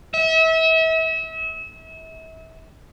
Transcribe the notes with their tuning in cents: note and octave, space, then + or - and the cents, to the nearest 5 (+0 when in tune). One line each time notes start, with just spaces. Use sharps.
E5 -35